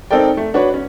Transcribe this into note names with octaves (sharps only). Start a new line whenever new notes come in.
C4 D#4 A4 A#4 D5 G5
A3
D4 F#4 B4 C#5
C#4